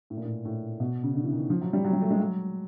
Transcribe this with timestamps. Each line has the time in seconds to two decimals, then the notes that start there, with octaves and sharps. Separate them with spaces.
0.10 A2
0.17 A#2
0.25 A2
0.45 A2
0.80 B2
1.03 C#3
1.15 D3
1.24 E3
1.32 D#3
1.50 F3
1.61 F#3
1.73 G3
1.85 F#3
1.93 G3
2.02 A3
2.11 G#3
2.20 F#3